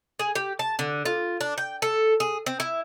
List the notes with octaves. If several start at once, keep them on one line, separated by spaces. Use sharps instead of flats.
G#4
G4
A5
D3
F4
D4
G5
A4
G#4
C4
E4